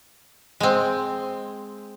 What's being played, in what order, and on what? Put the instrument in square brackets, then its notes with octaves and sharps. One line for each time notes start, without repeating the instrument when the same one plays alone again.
[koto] G#3 C4